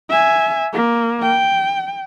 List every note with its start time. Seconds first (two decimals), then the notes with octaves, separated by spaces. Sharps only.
0.10 E5 G#5
0.73 A#3
1.23 G5